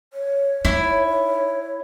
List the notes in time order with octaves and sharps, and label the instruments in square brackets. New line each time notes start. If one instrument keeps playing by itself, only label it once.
[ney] C#5
[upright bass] D#4 [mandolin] E4